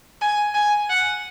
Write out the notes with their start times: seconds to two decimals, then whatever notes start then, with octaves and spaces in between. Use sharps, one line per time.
0.21 G#5
0.54 G#5
0.89 F#5